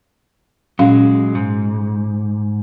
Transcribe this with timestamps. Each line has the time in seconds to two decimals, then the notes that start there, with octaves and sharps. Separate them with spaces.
0.79 A#2 F#3 G#3 C#4 F5
1.35 G#2